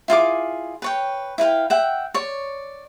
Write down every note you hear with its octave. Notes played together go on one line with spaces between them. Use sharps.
E4 F4 G#4 D6
B4 C#5 G5
E4 B4 F5 G5
E5 F#5 G5
C#5 D5